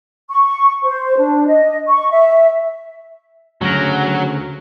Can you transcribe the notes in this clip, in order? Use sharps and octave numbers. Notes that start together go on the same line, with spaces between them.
C#6
C5
D4
D#5
C#6
E5
D2 C#3 F#3 A#4